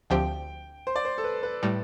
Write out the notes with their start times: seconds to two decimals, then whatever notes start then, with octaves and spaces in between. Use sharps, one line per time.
0.10 D2 D3 F3 C4 G4 G5
0.87 C5
0.96 D5
1.05 C5
1.18 A4
1.24 B4
1.43 B4
1.63 A2 G3